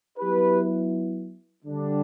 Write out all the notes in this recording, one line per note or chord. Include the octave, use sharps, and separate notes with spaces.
F#3 B3 E4 G4 B4
D3 G3 D4